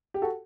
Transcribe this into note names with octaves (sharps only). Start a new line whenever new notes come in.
G4
F#4 A4